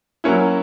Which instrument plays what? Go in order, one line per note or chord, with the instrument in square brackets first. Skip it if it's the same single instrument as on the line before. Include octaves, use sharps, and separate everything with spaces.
[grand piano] F#3 A#3 C#4 E4